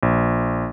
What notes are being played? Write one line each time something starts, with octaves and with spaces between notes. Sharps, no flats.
A#1